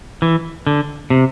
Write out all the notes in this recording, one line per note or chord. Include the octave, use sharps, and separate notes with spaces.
E3
D3
C3